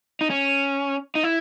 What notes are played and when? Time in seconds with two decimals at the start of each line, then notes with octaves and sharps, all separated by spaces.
0.21 D#4
0.30 C#4
1.15 D#4
1.23 E4